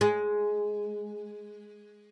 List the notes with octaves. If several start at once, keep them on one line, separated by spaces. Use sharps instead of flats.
G#3